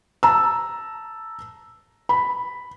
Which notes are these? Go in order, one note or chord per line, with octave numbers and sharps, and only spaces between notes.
A5 A#5 E6
B5